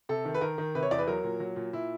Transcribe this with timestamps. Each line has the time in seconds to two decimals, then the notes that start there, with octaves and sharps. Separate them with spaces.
0.09 C3 A4
0.25 D#3
0.35 B4
0.41 D#3 A#4
0.58 D#3
0.75 C3 B4
0.83 C#5
0.91 E2 D5
0.99 B4
1.07 F#3 A#4
1.24 A#2
1.40 F#3
1.56 A#2
1.73 A#2 E4